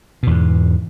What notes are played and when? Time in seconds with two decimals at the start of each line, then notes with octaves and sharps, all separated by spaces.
0.23 B2
0.27 E2
0.31 G#2